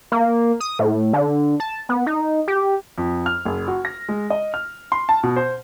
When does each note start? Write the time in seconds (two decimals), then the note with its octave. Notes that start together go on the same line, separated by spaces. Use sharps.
0.12 A#3
0.60 D#6
0.79 A2
1.13 D3
1.60 A5
1.89 B3
2.06 D#4
2.48 G4
2.98 F2
3.26 F6
3.45 F#1
3.68 F#4
3.85 A#6
4.08 G#3
4.30 D#5
4.54 F6
4.92 C6
5.09 A5
5.23 B2
5.36 C5